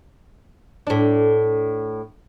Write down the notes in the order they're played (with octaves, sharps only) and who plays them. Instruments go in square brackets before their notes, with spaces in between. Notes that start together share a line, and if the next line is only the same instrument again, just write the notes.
[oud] A2 D4